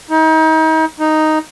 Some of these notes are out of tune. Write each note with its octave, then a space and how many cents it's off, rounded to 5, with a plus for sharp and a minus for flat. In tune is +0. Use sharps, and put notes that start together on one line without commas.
D#4 +35
D#4 +0